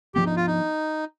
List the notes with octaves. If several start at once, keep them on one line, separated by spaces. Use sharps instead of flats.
F3 B3 D4 G4
D#4
F4
D#4